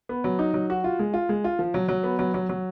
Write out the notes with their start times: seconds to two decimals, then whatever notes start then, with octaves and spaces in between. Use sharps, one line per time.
0.09 B3
0.24 F#3
0.39 D#4
0.54 F#3
0.70 F#4
0.84 F4
0.99 G#3
1.14 F4
1.29 G#3
1.44 F4
1.59 F3
1.74 F#3
1.88 F#3
2.04 B3
2.19 F#3
2.34 F#3
2.49 F#3